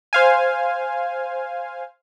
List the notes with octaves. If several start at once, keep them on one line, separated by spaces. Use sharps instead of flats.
C5 F5 G#5